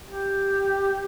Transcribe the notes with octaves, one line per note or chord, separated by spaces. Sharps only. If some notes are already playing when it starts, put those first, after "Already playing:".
G4